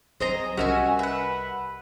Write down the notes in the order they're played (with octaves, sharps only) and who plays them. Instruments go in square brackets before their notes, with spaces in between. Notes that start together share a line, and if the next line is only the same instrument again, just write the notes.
[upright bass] F#3 [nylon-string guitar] C4 C5 [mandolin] G#4 D#5 A#5
[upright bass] C2 [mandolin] C#4 E5 G#5 [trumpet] F#4 [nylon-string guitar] G4 A#4 D#5
[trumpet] B4 [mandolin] E5 F#5